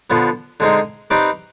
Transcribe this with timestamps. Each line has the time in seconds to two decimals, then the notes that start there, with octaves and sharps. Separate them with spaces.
0.10 D3 F3 B3
0.60 D3 G#3 C4 D#4
1.10 C4 D#4 G4 B4 D5